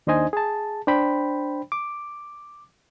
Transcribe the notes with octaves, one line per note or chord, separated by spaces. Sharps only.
D#2 D4 D#4 C5 D#5 G#5
G#4 A5
D4 C5 G5 B5
D6